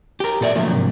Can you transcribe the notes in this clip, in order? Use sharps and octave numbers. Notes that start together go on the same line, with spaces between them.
G4 A#4
A#2 A4 D5 E5
B2 D3 F3 F#3 A3 A#3
G#2 C3